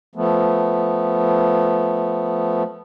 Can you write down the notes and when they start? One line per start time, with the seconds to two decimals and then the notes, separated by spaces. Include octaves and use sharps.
0.15 F3 A3 B3